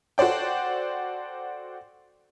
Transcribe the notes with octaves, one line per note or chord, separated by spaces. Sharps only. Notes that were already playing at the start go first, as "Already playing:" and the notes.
F#4 A4 C5 D5 G5